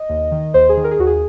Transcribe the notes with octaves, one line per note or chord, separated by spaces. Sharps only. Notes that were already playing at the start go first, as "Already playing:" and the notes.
Already playing: D#5
D#2
D#3
D#2 C5
G#4
D#3
A#4
G#4
D#2 F#4
G#4